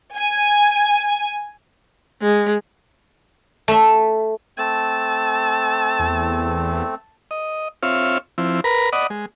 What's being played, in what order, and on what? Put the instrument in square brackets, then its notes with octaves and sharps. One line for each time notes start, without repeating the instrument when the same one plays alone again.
[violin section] G#5
[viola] G#3
[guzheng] A3 E5
[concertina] A3 C4 [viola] A5
[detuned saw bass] E2
[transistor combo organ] D#5
C4 F4 C#5 E5 F5
F3 C4 E4
A#4 B4 A#5 B5
D5 D#5 F#5 B5 D#6
G#3